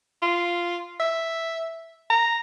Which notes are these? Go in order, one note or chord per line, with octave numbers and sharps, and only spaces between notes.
F4
E5
A#5